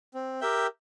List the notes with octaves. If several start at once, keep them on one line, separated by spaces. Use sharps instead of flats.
C4
G4 A#4 E5 G5